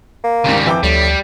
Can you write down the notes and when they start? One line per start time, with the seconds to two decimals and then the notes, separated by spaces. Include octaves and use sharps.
0.24 A#3
0.44 D#2 G#2 C#3 G3
0.66 F2 E3 G5 D6
0.83 D2 A2 G3